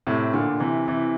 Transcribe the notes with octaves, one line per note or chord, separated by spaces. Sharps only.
A2 C3
A#2 D3
C3 E3
C3 E3